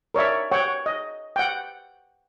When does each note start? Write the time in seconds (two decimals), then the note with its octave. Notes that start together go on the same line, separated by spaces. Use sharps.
0.14 A#4 C#5 D5 E5
0.51 C#5 F#5 G5
0.86 D#5
1.36 F#5 G5